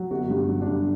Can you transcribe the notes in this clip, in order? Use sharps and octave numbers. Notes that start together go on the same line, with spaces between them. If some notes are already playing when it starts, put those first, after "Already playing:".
Already playing: F#3
G1 F#4
G2
G4
F#3
D4
G2